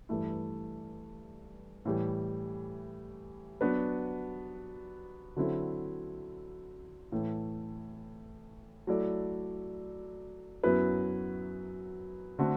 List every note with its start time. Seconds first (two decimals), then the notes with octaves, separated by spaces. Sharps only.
0.09 G2 E3 A3 E4
1.85 A2 E3 G3
3.61 F#3 B3 D4 F#4 B4
5.36 D3 F#3 C4 E4 A4
7.12 A2 E3 A3
8.87 F#3 A3 E4 A4 D5
10.63 F#2 F#3 B3 E4 B4
12.39 D3 A3 C4 F#4